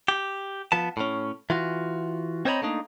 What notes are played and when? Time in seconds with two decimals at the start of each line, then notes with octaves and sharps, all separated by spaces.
0.08 G4
0.72 F3 B3 A5
0.97 A2 C#4
1.50 E3 F4 F#4
2.45 C4 C5 C#5 D#5 A#5 B5
2.62 A3 A#3 D4 D#4